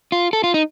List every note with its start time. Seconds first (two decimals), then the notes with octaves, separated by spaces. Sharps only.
0.12 F4
0.33 A4
0.44 F4
0.54 D#4